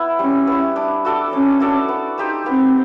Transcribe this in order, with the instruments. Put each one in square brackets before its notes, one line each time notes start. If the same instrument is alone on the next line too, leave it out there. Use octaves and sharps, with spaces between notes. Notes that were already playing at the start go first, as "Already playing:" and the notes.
Already playing: [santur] B3 E4
[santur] G3 [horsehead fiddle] C#4
[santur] B3 E4
D4
F#4 A4 D5
[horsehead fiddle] C#4 [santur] D4
[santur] F#4 A4 D5
B3
D#4 G4 C5
[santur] B3 [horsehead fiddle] C4